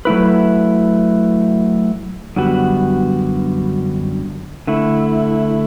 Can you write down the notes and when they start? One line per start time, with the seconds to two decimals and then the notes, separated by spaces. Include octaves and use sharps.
0.05 F#3 A3 E4 B4
2.36 F#2 D3 G3 B3 F#4
4.67 D3 A3 E4